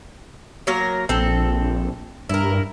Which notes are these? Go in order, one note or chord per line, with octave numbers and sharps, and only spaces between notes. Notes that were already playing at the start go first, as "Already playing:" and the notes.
F#3 A#3 A#4
A#1 C4 A4
G2 E4 A#4